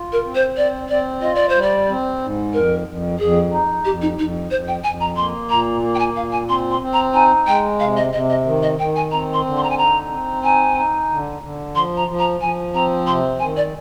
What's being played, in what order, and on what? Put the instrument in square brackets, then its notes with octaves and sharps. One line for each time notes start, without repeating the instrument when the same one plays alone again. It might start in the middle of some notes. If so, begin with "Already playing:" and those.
Already playing: [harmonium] F4
[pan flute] A#4
[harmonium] C4
[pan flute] C5
[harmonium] C4 [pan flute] D5
[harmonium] C4 [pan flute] D5
[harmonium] F4 [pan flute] D#5
[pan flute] D5
C5
[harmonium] G3
[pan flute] D5
[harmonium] C4
G#2
[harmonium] F2 [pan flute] A#4
[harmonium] F2
[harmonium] F2 [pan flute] G#4
[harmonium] D#4
[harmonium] F2 [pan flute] G4
[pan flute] D#4
[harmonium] F2 [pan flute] D#4
[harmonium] F2 [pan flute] C5
[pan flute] G5
[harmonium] F2 [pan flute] G#5
[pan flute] A#5
[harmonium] A#3 [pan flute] C6
[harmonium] A#2 [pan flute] A#5
[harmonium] A#3
[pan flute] G5
G#5
[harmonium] A#2 [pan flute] F5
[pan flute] G#5
[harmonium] C4 [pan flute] C6
[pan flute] C6
[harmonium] C4
[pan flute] A#5
[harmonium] D#4 [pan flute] G#5
[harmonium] G#3 [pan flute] G5
[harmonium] C3 [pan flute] F5
[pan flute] D#5
[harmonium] C3 [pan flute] D#5
[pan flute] D#5
[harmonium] D#3
[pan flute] D#5
[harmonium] D#3 [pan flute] G5
[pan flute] G#5
[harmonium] C4 [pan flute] A#5
[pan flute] C6
[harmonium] D3
[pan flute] C6
A#5
G#5
[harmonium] D#4 [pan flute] A#5
[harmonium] C4
[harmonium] D#4 [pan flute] G#5
[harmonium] D#4
D3
D3
[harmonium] F3 [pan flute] C6
[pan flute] A#5
[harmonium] F3
[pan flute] A#5
[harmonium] F3 [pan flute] G#5
[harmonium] C4 [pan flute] A#5
[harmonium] C3 [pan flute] C6
[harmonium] D#3 [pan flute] G#5
[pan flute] D5